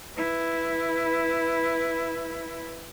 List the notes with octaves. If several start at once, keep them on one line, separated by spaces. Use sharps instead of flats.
E4 B4